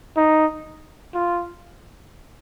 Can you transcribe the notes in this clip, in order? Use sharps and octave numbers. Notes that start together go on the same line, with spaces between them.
D#4
F4